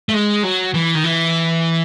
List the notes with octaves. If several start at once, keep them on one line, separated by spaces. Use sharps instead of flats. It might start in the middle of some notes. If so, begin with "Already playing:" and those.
A3
G#3
F#3
E3
D#3
E3